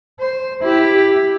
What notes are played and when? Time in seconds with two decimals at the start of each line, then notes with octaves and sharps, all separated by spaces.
0.20 C5
0.62 E4 G4